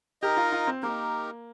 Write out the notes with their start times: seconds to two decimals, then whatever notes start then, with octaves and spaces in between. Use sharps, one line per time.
0.22 D#4 G4 A#4 D#5
0.37 F4
0.52 F4
0.67 C4
0.82 A#3 D#4 G4 A#4